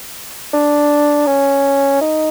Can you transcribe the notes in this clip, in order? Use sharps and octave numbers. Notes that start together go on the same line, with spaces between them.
D4
C#4
D#4